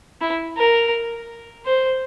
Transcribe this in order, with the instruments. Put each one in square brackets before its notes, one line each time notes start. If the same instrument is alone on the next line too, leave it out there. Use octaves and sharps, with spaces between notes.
[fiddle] E4
A#4
C5